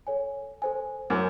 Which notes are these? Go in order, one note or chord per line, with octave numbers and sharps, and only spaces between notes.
A4 C#5 G#5
A4 C5 G#5
F#2 G#5 D6